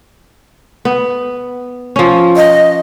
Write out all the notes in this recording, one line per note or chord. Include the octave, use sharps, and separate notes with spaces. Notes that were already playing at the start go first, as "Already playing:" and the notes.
B3
F3 C#4
D#5